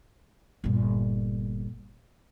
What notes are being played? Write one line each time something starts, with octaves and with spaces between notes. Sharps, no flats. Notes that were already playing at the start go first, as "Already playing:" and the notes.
G1 A#2